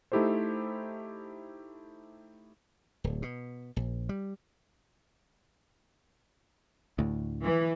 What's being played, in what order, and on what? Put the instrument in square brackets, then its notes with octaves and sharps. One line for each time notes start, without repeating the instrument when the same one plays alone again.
[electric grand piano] A3 D#4 E4 G4 A4 C5
[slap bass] D1
B2
A#1
G3
[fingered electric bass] D2 A2
[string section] E3